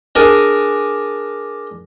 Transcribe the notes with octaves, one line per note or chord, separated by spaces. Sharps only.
D4 G#4 A#4 G#5